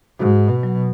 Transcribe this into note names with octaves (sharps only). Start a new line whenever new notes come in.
G#2 F#4
B2
F#3